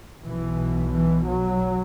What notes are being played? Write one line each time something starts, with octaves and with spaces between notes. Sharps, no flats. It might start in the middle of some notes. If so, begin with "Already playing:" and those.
B1 B2 E3
E3
F#3